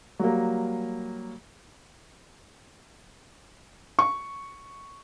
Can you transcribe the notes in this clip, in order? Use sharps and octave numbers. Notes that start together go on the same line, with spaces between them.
F#3 G3 A#3
C#6